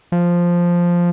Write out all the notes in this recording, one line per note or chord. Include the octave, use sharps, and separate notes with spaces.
F3